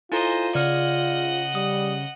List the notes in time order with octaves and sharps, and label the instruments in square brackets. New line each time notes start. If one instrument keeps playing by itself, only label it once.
[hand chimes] E4 A4 A#5 [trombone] F4 [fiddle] C5 D#5 [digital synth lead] G#5
[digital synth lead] C#3 [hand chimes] D5 F6 [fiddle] D#5 F#5
[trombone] G3 [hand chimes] D#6